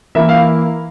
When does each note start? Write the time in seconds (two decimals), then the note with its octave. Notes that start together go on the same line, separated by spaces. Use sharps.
0.15 E3 A#3 E4 E5
0.29 F5